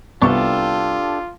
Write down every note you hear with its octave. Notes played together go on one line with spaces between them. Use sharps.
C2 B3 D4 F4 G4 A4 C#6